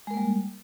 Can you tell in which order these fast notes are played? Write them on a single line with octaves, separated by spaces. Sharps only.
G#3 A#4 A#3 G3